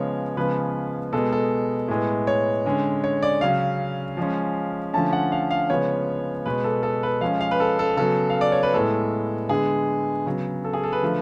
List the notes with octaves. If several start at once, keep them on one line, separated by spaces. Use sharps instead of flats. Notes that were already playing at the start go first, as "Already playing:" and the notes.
Already playing: C#3 F3 G#3 B3 C#5
C#3 F3 G#3 B3 B4
B2 G#3 B3 A4
A4
A2 G#3 B3
C#5
D3 G#3 C#4
C#5
D5
C#3 F#3 C#4 F5
F3 G#3 C#4
D3 F3 A3 C#4 A5
F#5
F5
F5
C#3 F3 G#3 B3 C#5
B2 G#3 B3 B4
A4
A4
B4
F3 G#3 C#4 F5
F5
B4
A4
A4
C#3 F#3 B3 A4
F5
D5
C#5
B4
A2 G#3 B3 A4
D3 G#3 B3 G#4
C#3 F#3 B3
A4
G#4
A4
B4
D3 F3 A3